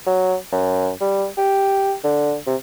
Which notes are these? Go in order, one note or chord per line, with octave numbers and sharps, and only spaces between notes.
F#3
F#2
G3
G4
D3
C3